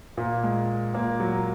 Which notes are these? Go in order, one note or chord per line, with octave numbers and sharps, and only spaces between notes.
A#2 A#3
G#3
A#2 A#3
F#3